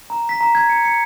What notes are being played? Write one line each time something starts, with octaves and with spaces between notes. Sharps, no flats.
A#5
B6
A#5
G#6
C#7
C#7